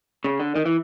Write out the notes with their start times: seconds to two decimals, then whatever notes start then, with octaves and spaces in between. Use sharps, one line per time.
0.24 C#3
0.40 D3
0.56 D#3
0.66 E3